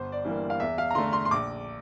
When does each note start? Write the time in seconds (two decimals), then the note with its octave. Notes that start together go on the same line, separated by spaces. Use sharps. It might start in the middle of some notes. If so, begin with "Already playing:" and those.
Already playing: G1 C5
0.12 D5
0.24 G2 E3 G3 A#3
0.50 F5
0.60 E2 E5
0.78 F5
0.90 A#5
0.95 D3 A3 C6
1.13 C6
1.25 C6
1.31 A#1 D6